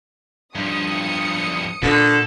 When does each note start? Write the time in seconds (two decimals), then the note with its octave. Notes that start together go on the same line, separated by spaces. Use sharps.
0.55 G2 F3 D#6 C#7
1.83 A#2 D3 A4